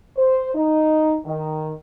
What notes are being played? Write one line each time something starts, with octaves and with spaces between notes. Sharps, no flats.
C5
D#4
D#3